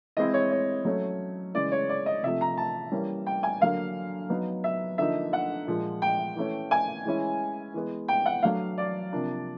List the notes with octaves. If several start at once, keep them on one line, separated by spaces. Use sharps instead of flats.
E3 G#3 C4 E4 D#5
C#5
C#5
F#3 A3 C#4
C#3 E3 G#3 D5
C#5
D5
D#5
C3 F3 A3 E5
A#5
A5
E3 G3 A#3 C#4
G5
G#5
D3 F#3 A#3 F5
F#3 B3 D#4
E5
D3 F3 A#3 D#4 E5
F#5
A#2 F3 G#3
G5
E3 A3 C#4
G#5
E3 G#3 C#4 E4
E3 G#3 B3
G5
F#5
F#3 A3 D4 F5
D5
C3 F3 A#3 D4